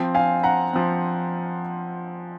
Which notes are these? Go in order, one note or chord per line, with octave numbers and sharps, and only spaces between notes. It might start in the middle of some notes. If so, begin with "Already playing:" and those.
Already playing: F3 C4
F5 G#5
F#5 A#5
F3 C4